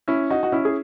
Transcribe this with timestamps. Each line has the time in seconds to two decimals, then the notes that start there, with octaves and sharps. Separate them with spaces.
0.08 C#4 E4
0.30 D#4 F#4
0.43 F#4
0.52 C#4 E4
0.65 G#4